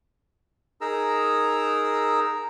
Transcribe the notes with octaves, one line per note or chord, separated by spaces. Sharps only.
D#4 G#4 A#4 A#5 E6